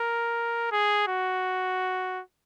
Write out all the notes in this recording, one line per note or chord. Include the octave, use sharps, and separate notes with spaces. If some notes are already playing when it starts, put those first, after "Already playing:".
Already playing: A#4
G#4
F#4